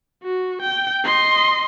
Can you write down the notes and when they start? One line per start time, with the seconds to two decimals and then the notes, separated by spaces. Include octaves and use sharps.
0.23 F#4
0.62 G5
1.04 D#5 C6